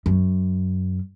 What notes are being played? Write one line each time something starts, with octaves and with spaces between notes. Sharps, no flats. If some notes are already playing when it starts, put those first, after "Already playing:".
F#2